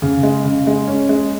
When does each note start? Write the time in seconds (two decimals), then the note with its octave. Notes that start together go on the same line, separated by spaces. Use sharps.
0.02 C#3
0.23 G#3
0.44 C#3
0.67 G#3
0.88 C#4
1.09 G#3